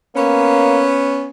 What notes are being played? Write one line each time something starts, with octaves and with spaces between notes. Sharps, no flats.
A#3 B3 C#4